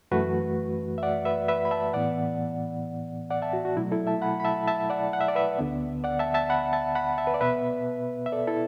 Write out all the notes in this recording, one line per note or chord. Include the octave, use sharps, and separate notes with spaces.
F#2 E3 A3 F#4 B4
E5
D5 F#5
B4 E5
B4 E5
B5
E5 A5
A2 E3 B3 D5 F#5
D5 F#5
E5 A5
F#4
F#4
B2 F#3 A3 E4
E4 A4
E5 A5
F#5 B5
B5
E5 A5
E5 A5
D5 F#5
F#5
E5
D5
B4 E5
D2 D3 B3
D5 F#5
E5 A5
E5 A5
F#5 B5
E5 A5
F#5 B5
E5 A5
B4
D5
B2 B3 B4 E5
E5
A4 D5
E4 A4